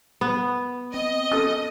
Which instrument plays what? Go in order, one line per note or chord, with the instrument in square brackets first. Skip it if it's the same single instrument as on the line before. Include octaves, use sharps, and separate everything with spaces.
[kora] B3
[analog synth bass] C4 [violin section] D#5
[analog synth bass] C#4 [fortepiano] A4 D#6